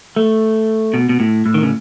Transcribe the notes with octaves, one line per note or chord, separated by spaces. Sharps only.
A3
B2
B2
A2
A2
D#3
C#3